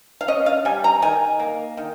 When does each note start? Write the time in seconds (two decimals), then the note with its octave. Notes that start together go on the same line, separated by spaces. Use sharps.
0.21 F5
0.28 C#4 D#5
0.46 F5
0.65 G3 G#5
0.84 A#5
1.02 D#3 G#5
1.40 A#3
1.77 D#3